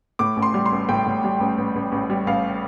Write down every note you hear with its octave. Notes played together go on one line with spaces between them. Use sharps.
A2 D6
A1
C6
G3
C6
A1
A2 G5
A2
G3
A1
A1
A1
A1
G3
A1 F5